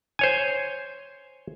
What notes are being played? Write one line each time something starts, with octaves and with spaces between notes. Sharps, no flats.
C5 C#5 G#5